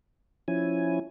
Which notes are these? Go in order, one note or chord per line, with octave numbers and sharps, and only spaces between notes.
F3 C#4 E4 G#5